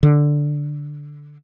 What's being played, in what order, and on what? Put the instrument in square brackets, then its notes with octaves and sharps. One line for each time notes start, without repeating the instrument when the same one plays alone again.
[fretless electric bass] D3